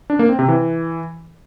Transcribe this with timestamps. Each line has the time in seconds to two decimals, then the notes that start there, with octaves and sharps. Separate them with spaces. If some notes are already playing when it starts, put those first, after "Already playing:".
0.10 D4
0.19 A#3
0.29 C4
0.39 C3
0.48 E3